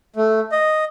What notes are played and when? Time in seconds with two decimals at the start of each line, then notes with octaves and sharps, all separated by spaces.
0.16 A3
0.52 D#5